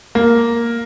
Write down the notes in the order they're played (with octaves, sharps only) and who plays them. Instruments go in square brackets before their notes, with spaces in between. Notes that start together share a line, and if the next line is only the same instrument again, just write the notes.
[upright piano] A#3